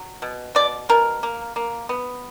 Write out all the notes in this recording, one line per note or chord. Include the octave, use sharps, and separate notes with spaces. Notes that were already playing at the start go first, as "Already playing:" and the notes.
Already playing: F#3
B2
B2 D5
B2 A#4
A#3
A#3
B3